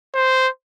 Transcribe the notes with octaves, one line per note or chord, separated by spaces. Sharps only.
C5